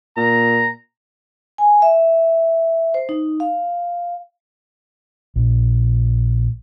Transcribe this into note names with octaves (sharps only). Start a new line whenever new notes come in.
A#2 A#5
G#5
E5
C5
D#4
F5
A#1